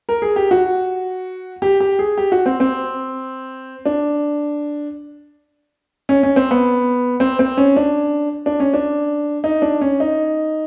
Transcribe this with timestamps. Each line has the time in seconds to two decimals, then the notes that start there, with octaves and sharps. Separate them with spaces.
0.09 A#4
0.22 G#4
0.36 G4
0.51 F#4
1.62 G4
1.80 G4
1.99 G#4
2.18 G4
2.32 F#4
2.46 C4
2.60 C4
3.85 D4
6.09 C#4
6.23 C#4
6.36 C4
6.51 B3
7.20 C4
7.39 C4
7.57 C#4
7.76 D4
8.46 D4
8.60 C#4
8.74 D4
9.44 D#4
9.62 D4
9.81 C#4
10.00 D#4